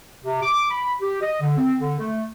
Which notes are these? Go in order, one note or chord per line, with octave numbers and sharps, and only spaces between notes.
C3
D6
B5
G4
D#5
D3
C4
D3
A3